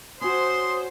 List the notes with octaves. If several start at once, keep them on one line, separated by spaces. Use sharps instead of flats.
C#4 F#4 C5 C6 D#6